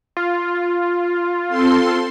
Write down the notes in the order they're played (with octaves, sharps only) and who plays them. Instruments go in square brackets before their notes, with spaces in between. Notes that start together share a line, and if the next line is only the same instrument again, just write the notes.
[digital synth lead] F4
[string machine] C4 A4 C6